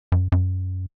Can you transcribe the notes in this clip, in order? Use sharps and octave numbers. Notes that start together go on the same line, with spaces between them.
F#2
F#2